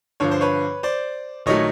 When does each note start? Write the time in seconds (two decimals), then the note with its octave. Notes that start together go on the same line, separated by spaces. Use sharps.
0.20 G2 D3 F3 C#5
0.31 C5
0.41 B4 C#5
0.83 C5 D5
1.46 A#1 D#3 F#3 A3 C#5 D#5